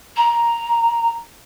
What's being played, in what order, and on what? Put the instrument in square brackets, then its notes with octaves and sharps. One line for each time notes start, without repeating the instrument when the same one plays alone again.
[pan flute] A#5